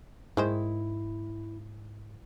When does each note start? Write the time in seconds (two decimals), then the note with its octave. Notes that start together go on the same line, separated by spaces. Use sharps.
0.37 G#2 D#3 G#3 E4 C5